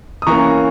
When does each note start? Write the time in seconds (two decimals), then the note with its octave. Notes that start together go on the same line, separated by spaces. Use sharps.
0.22 D#6
0.27 E3 A#3 C#4 A#5 C#6